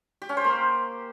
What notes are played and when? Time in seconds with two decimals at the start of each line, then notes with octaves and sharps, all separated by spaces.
0.22 G4
0.29 C#4
0.37 C5
0.44 A#3